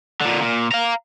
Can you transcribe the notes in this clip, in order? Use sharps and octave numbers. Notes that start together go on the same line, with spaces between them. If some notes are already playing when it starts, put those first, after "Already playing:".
A#2 D3
A#2
F5 A#5